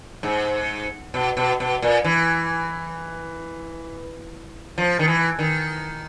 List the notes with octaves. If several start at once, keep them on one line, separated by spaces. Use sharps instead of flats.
G#2
B2
B2
B2
A#2
E3
F3
D#3
E3
D#3